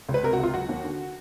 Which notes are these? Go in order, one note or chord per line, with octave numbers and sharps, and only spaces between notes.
C#2
B4
C3 A#4
F#4
C#2 F4
F#3 F#4
D#2
D3